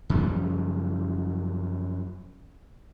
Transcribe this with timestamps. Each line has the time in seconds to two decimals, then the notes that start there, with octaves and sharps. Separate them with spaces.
0.10 F#2 C#3 F3 G3